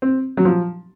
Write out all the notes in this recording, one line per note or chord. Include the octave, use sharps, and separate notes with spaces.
C4
F#3
F3